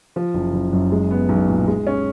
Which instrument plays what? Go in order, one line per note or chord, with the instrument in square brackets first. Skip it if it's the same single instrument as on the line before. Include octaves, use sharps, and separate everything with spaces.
[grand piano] F3
F#1
F#1
F#2
G#3
B3
B1
A#2
G#3
C#4